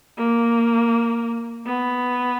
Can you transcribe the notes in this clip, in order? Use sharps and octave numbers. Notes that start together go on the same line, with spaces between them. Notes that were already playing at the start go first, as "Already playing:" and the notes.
A#3
B3